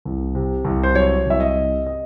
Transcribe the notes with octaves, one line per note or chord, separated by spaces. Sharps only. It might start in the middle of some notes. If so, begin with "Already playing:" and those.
C2
C3
C2
C5
F#3 C#5
C2 E5
D#5
C3
D#5